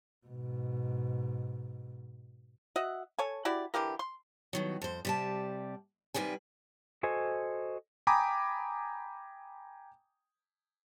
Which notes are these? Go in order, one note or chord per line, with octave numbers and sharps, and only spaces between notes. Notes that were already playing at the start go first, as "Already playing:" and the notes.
G#2 B2
F#4 D#5 E5 F#5
A4 C#5 G#5
E4 F#4 G4 D5
D3 E3 G4 A#4
C6
B2 D#3 F#3
F2 C5
C3 G3 A5
C3 D#3 G3 B4 G#5
F#4 A4 C5 D#5 G#5
G5 G#5 A#5 B5 D6 D#6